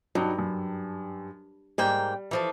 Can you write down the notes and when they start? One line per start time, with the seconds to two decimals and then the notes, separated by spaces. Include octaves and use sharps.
0.15 G2 F#3 D#4
0.39 F#2
1.78 G#2 G3 A#3 G5
2.31 E3 F3 A4